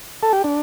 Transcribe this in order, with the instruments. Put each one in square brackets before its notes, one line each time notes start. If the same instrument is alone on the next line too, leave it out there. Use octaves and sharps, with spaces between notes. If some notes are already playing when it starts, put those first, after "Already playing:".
[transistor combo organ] A4
G4
D4